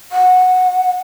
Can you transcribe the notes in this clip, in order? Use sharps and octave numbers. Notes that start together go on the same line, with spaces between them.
F#5